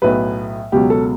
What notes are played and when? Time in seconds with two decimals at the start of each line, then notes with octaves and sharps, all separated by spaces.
0.02 B1 A2 F#3 B4
0.72 C#2 B2 F#3 G4
0.90 A4